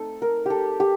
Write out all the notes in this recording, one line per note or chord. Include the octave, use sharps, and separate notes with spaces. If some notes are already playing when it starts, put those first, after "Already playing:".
Already playing: A3 C4 D#4 A4
A#4
G4 A4
G4